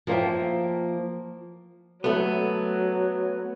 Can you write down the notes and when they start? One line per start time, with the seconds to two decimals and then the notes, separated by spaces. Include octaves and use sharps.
0.07 F3 A#3 C5 E5 G5
2.04 F#3 A3 B3